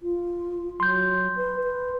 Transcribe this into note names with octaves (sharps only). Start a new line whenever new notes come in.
F4
F#3 C6 G6
B4
B4